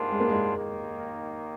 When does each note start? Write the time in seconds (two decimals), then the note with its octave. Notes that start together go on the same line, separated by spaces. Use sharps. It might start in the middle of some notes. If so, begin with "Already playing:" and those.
Already playing: G#2 G3 A#3 D4 F4
0.11 G#3
0.20 A#3
0.29 G#3
0.56 D#2 D#3 A#3